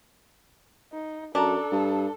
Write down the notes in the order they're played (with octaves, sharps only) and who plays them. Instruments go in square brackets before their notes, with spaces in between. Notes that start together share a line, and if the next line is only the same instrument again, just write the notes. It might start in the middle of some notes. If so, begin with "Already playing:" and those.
[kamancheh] D#4
[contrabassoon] F#2 [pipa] D4 A5 A#5 [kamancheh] A4
[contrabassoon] G2